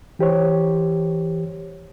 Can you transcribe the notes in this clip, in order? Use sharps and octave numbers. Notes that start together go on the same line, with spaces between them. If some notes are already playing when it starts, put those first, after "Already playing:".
E3 G4 C5 C#5